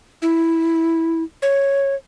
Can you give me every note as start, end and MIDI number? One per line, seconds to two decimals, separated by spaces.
0.22 1.23 64
1.42 1.95 73